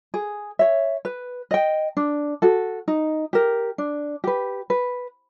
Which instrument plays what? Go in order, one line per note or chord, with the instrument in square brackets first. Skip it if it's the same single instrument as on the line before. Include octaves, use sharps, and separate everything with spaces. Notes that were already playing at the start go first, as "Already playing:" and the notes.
[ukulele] G#4
C#5 E5
B4
D#5 G5
D4
F#4 A4
D#4
G4 A#4
D4
G4 B4
B4